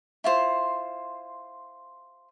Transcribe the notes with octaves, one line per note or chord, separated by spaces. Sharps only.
E4 F4 C5